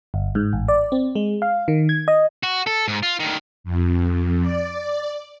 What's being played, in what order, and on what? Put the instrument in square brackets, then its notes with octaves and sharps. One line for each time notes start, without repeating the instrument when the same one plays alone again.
[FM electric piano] G1
G#2
A1
D5
C4
G#3
F5
D#3
G#6
D#5
[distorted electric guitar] F#4
A4
G#2
F4
D2 D#3
[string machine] F2
D5